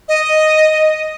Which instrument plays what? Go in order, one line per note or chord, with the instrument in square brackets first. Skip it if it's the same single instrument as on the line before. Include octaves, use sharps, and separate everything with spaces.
[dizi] D#5